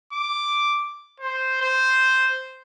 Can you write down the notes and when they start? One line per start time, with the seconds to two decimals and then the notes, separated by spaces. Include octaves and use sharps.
0.13 D6
1.20 C5
1.62 C5